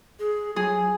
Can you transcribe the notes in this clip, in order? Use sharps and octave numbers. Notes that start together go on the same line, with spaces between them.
G#4
F#3 G#4